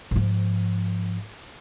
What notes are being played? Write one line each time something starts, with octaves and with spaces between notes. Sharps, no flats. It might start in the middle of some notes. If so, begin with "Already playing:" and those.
G#2 F3